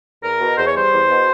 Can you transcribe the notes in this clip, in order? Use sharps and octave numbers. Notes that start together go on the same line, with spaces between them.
E2 A#4
B2
E2 C5
C#5
G3 C5
E2
B2